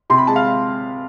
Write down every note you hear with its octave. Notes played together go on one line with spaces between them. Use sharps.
C3 C6
B5
G#3 A5
F5